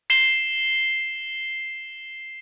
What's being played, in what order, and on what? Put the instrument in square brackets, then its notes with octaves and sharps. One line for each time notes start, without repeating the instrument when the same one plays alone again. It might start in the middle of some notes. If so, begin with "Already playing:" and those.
[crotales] C7 E7 G7